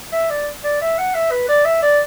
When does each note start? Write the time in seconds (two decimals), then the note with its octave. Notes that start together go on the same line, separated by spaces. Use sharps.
0.12 E5
0.30 D5
0.64 D5
0.81 E5
0.98 F#5
1.14 E5
1.31 B4
1.48 D5
1.65 E5
1.82 D5